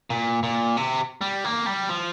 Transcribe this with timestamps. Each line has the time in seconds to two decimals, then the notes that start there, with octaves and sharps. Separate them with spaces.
0.10 A#2
0.43 A#2
0.77 C3
1.21 G3
1.45 A#3
1.66 G3
1.89 F3